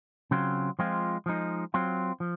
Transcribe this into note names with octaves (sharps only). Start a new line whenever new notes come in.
C#3 F#3 C4 F4
F3 G#3 C4 F4
F3 G#3 D#4
F#3 C4 F4
F3